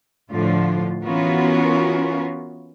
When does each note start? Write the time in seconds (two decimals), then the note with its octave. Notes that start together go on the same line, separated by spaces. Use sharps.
0.31 A2 D3 F3 F4
1.03 E3 B3 C#4 F4 F#4 A#4